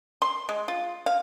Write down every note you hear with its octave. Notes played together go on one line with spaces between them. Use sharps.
C6
G#3
F4
F5